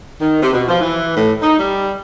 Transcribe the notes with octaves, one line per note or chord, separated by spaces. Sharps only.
D#3
C3
B2
F3
E3
A2
D#4
G3